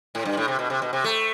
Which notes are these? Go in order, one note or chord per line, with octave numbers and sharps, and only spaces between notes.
A2
G2
A2
C3
B2
C3
B2
C3
A3